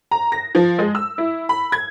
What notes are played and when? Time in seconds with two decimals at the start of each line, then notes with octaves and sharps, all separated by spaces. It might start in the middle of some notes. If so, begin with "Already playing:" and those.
0.11 A#5
0.32 A#6
0.55 F3
0.79 G#3
0.95 E6
1.18 E4
1.49 B5
1.72 G#6